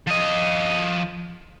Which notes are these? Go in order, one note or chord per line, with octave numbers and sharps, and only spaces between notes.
F3 D#5